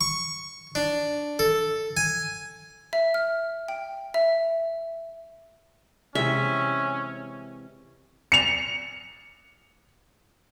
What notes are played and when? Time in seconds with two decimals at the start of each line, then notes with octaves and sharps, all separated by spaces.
0.01 C#6
0.75 D4
1.39 A4
1.97 G#5
2.93 E5
3.14 F6
3.68 G5
4.14 E5
6.15 C3 E3 G#3 C#4 E5
8.32 C#7 F7